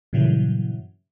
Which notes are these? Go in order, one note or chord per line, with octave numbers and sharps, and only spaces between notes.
G2 A#2 C#3 E3 F#3